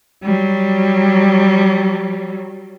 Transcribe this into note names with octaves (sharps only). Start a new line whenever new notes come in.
F#3 G3